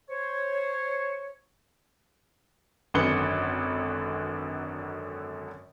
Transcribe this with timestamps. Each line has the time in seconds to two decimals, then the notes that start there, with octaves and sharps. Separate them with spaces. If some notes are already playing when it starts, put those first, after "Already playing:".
0.09 C5 C#5
2.94 G#1 F#2 D3 B4 C#7 G7